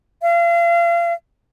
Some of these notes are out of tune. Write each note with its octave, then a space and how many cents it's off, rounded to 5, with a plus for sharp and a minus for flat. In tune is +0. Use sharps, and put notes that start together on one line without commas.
F5 -35